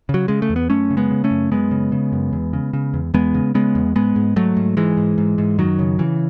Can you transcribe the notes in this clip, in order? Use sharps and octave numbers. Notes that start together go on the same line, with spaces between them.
C#3
F#3
C#3 G#3
A3
E2
B3
F#2 A3 C#4
C#3
G#3 B3
C#3
A3 C#4
F#2
F#2 G#3 B3
C#3
C#3
F#2
E2
C#3
C#3
E2
E2 G#3 B3
C#3
C#3 G#3 B3
E2
G#2 G#3 B3
G#2
G#2 F#3 A3
G#2
G#2 E3 G#3
G#2
G#2
G#2
F#2 D#3 F#3
C#3
C#3 E3